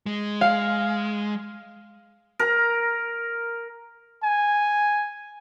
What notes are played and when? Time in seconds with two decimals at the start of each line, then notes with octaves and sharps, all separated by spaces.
0.06 G#3
0.41 F5
2.39 A#4
4.23 G#5